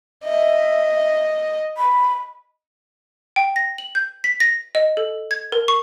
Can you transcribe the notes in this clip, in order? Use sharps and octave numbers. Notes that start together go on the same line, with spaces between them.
D#5 E5
B5
G5
A#6
F#7
G6
B6
A#6
D#5
A4
G#6
A#4
C#6